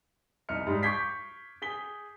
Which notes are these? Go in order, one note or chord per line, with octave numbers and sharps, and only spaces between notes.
C2 D#4 D#5 F6 C#7
G#2 G3
C#6 D6 G6 G#6 B6 C7
G#4 B6 G7